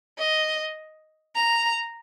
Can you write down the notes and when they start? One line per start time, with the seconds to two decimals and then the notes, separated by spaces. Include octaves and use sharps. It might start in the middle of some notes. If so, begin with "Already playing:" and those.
0.18 D#5
1.35 A#5